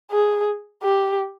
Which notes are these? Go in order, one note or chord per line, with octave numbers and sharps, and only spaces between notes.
G#4
G4